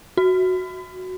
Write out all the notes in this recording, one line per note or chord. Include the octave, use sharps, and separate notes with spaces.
F#4